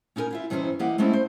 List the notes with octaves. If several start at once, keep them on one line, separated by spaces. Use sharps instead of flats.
C#4 D#4 E4 A#4 G#5
E4 F4 E5
G2 E3 C4 C#4 D#4 C5
E3 A#3 G4 D#5 F5 F#5
G#3 A3 C4 C#4 E4
C5